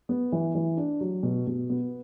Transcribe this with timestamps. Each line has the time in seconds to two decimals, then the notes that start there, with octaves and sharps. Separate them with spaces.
0.09 B3
0.32 E3
0.55 E3
0.77 D4
1.01 F#3
1.23 B2
1.47 B2
1.70 B3